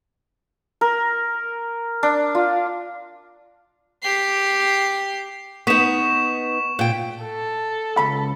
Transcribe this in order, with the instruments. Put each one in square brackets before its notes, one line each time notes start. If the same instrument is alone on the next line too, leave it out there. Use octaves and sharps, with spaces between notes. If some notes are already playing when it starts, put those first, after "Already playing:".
[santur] A#4
D4
F4
[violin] G4 C7
[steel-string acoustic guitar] B3 D#4 [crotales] C#6 B6 E7
[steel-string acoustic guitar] A#2 G5
[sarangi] A4
[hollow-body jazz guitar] C#2 B5